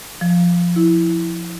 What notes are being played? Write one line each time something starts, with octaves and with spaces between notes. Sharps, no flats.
F3
E4